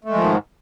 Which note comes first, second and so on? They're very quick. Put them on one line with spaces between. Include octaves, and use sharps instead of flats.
A3 G#3 F3 D#3 G#2